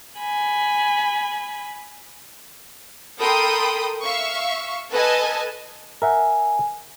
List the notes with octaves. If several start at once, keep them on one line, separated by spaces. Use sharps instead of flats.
G#5 B5
A4 A#4 G5 B5 C6 D#6
E5 F5 C#6
A4 B4 D#5 G#5 A5
A#4 E5 F#5 G#5